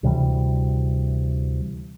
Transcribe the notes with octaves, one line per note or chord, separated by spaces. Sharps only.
D2 C3 E3 G3